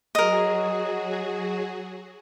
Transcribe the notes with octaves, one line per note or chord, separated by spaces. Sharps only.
F#3 F#4 G#4 A#4 D#5